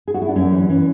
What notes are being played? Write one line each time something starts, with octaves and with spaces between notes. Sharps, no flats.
G#4
F#4
E4
D4
F#2 C#4
E3
E3 C#4